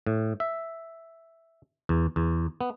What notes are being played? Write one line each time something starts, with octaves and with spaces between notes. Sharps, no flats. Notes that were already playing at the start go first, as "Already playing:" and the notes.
A2
E5
E2
E2
B3